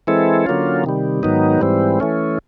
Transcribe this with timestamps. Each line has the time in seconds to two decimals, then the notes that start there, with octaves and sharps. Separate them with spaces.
0.07 E3 G#3 C4 E4 A4
0.46 D3 F#3 A#3 C#4 F4
0.84 C3 D#3 G3
1.23 G#2 D#3 F#3 B3 D#4
1.61 G#2 E3 G3 C4
2.00 E3 A3 C#4